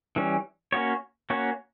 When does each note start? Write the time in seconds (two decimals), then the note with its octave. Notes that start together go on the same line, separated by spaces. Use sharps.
0.16 E3 G3 C#4
0.72 A#3 C#4 F#4 C#5
1.30 A#3 C#4 F#4 C#5